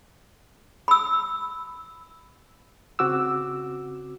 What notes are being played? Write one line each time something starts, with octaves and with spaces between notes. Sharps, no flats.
B5 E6
C#3 C4 F#4 D6 E6